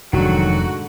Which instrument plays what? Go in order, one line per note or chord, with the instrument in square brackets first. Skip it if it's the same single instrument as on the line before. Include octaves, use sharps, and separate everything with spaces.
[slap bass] F1 [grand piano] G#2 D3 [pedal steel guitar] D#3 F#3 [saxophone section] F#4